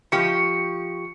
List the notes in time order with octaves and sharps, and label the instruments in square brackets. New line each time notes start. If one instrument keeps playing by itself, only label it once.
[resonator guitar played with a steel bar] F3 G4 [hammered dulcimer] C#6